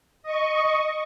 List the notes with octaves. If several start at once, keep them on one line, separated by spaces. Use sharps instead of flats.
D#5 C#6